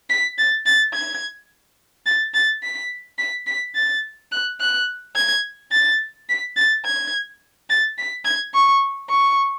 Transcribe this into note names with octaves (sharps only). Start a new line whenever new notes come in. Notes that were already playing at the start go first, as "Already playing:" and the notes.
B6
A6
A6
G#6
A6
A6
B6
B6
B6
A6
F#6
F#6
G#6
A6
B6
A6
G#6
A6
B6
G#6
C#6
C#6